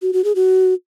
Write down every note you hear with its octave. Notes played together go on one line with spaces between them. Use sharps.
F#4
F#4
G#4
F#4